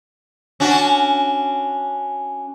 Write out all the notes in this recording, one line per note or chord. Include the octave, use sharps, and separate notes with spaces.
C#4 D4 F#4